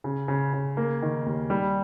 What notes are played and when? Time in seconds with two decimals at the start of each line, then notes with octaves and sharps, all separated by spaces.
0.04 C#3
0.28 C#3
0.53 C#3
0.77 A#3
1.02 D#3
1.26 D#2
1.50 G3